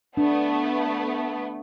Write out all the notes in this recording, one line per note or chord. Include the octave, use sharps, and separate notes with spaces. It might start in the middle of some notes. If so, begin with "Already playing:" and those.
A3 B3 D4